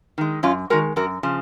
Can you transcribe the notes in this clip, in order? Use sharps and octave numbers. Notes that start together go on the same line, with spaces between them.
D#3 G#3
F#2 C#4 F4
D#3 G#3 F#4 A#4
F#2 F#4 A#4
C#3 F3